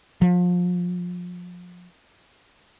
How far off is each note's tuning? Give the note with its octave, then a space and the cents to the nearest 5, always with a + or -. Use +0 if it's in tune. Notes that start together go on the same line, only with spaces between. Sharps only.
F3 +30